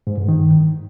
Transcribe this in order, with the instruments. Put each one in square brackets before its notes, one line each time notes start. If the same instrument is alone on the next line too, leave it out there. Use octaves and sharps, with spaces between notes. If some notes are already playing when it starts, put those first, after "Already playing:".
[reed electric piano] G#2
G2
D#3